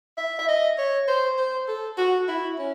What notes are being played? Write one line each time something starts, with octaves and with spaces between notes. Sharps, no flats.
E5
E5
D#5
C#5
C5
C5
A4
F#4
E4
C#4